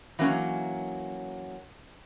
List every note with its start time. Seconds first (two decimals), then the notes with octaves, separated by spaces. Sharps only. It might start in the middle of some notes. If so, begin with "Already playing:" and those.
0.19 E3 F#3 A#3 C#4